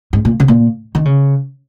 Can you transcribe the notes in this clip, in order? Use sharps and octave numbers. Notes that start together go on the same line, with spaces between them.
G#2
A#2
C#3
A#2
D#3
C#3